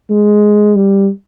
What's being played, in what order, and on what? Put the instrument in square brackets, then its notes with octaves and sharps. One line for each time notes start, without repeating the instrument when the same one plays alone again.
[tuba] G#3
G3